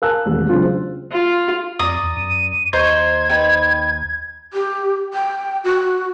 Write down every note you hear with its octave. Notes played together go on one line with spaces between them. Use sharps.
A#4 F5 G#5 A5 E6 F#6
E1 A1 D#2
C#3 F#3 C4 D4 F4
C5
F4
F2 D5 A#5 D#6
E2
F#2 D#7
D#2 D#4 C5 C#6 G#6
D#4 B4 G5
G4
G5
F#4